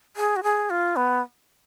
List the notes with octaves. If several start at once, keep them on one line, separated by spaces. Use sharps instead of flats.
G#4
F#4
G#4
F4
B3